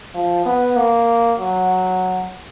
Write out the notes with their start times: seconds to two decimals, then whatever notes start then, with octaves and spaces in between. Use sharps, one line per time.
0.15 F3
0.46 B3
0.77 A#3
1.38 F#3